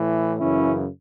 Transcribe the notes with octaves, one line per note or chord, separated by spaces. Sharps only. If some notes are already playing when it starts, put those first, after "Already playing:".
Already playing: A2 E3
F#2 C#3 E3 C#4 E4